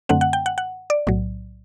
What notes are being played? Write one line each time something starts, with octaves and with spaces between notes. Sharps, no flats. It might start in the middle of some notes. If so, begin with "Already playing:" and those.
F#2 D3 A3 C4 F#5
F#5
G5
F#5
F#5
D5
B1 A2 F#3